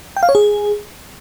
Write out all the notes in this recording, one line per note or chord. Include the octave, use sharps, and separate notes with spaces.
G5
F5
C#5
G#4